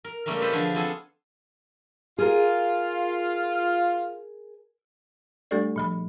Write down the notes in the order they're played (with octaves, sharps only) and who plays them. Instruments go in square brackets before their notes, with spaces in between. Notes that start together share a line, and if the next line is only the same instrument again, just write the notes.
[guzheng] A#4
C#3 G3 A3 A#3 A#4
F4 G4 A4 B4 C5 D#5
D3 F3 D4 G#4
B3 C4 F4 G#4 A4 G#5
[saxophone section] F4 [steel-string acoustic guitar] G#4 A#4
[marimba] G3 A3 D4 G4 A4 D5
A#2 F3 B5